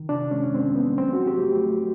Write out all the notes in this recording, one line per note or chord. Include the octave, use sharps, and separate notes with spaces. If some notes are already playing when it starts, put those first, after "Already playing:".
Already playing: D#3
C3 D4
G#3 C#4
G#3 C4
F3 B3
F#3 C4
F#4
F#3
G4
A3
F#3